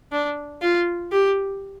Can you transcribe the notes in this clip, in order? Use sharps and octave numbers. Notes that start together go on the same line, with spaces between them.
D4
F4
G4